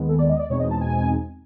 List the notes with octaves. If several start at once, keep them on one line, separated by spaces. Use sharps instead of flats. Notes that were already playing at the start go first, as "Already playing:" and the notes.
Already playing: D#2 D#3 G#3 B3
A4
D5
D#5
D5
E2 B2 G#3 C4 D#4 C#5
D#5
A5
G#5